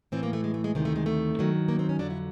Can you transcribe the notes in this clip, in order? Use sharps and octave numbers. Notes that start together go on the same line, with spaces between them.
A2 E3 C4
A#3
A3
G#3
A3
G#3
D2 C3 D#3 G#3
A3
G#3
A3
G2 D#3 F#3
A#3
C4
C#4
F2 D3 F#3 D4
E4